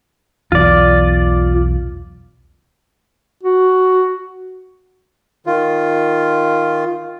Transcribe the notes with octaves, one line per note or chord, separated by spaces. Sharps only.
B1 E2 F4 D5
F#4
D#3 F4